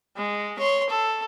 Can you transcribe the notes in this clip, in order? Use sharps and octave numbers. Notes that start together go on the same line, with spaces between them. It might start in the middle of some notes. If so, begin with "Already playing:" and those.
G#3
C#5 C6
A4